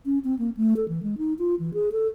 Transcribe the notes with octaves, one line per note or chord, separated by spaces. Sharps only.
C#4
C4
A#3
A3
A4
E3
G#3
D#4
F4
E3
G#4
A4